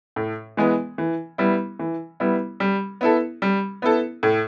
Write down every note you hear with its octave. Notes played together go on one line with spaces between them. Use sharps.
A2
E3 G#3 B3
E3
G3 B3 E4
E3
G3 B3 E4
G3
B3 E4 A4
G3
B3 E4 A4
A2